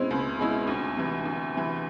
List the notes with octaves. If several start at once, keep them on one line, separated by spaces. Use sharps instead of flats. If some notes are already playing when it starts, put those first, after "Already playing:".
Already playing: B2 G#3 C4 C#4 E4 C5
C#2
B2 G#3 C#4 E4
D2
C3 E3
D2
C3 E3